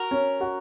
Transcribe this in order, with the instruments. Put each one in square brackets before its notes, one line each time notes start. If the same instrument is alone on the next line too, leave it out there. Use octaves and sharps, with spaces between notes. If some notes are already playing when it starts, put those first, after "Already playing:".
Already playing: [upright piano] F#4 [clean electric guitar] A#4
[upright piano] C#4
F#4